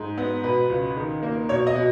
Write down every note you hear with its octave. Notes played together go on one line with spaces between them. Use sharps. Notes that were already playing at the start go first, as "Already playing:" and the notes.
Already playing: G#2
B3
B2 B4
C#2
D#3
A#3
B2 C#5
D#5
B2